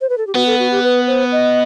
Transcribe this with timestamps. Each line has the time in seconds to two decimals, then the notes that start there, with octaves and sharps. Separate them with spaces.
0.01 C5
0.09 B4
0.18 A4
0.27 G4
0.35 B3 F#4
0.47 A4
0.59 F#4
0.71 G4
0.83 B4
1.07 C5
1.32 D#5